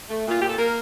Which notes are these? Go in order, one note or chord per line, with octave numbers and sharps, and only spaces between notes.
A3
A#2 F4
A#2 G4
A4
A#3 A#4